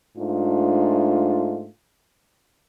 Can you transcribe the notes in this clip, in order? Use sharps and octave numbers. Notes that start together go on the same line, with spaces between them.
G#2 A3 D4 F4